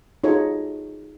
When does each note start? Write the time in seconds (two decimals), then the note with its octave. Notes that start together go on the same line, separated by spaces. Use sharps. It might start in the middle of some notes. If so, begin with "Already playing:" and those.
0.24 D#4 F4 F#4 G#4 A4 C#5